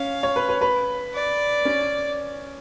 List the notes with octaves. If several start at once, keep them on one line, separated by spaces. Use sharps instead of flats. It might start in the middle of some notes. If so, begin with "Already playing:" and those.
Already playing: C#4 F5
C#5
B4
B4
B4
D5
C#4